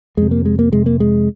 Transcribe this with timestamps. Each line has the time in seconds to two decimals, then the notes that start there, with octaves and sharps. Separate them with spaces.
0.17 F2 C3 G#3
0.31 A#3
0.45 G#3
0.59 A#3
0.72 F2 C3 G#3
0.86 A#3
1.00 G#3